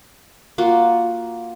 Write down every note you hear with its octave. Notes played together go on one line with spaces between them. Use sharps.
A#3 F4 F#4 F#5